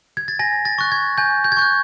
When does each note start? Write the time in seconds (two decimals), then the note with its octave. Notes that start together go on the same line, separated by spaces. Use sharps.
0.17 G#6
0.28 A6
0.39 G#5 A#6
0.65 A6
0.78 C#6 F#6
0.92 G#6
1.18 G#5 G6
1.44 G6
1.52 G#6
1.57 C#6 F#6 G6